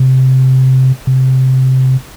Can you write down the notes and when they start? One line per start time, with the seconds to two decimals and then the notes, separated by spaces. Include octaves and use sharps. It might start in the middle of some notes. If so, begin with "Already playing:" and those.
Already playing: C3
1.07 C3